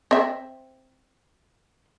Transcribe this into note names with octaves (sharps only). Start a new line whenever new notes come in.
C4 E5